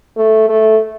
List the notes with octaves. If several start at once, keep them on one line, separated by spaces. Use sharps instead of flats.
A3
A3